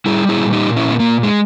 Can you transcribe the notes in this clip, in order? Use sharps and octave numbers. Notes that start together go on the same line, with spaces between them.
G3 E4 G#4
E4 G#4
A#2
D#4 G4
A#2
C#4 E4
B3
A#2 A#3
G#3